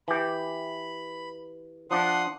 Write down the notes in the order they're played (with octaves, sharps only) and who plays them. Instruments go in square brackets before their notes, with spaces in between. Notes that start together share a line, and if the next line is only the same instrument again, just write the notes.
[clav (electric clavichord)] E3 G4 [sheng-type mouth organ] B5
[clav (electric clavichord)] F3 D4 [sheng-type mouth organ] F#5 C6 D#6